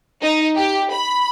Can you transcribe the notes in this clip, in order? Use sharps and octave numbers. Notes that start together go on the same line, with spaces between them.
D#4
G4
B5